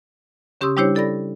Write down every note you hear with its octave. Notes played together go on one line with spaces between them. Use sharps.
C#3 C#4 G4 C6 D#6 E6
G3 D4 E4 G4 C5 C#5
E4 A4 D5 B5 A#6